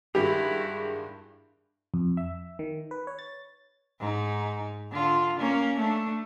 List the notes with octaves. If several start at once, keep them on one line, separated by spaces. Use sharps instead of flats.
G2 D#3 G#3 E4 F#4 G4
F2
E5
D#3
B4
C#5
A6
G#2 D#4
D3 F4
A#3 C#4
A3 D4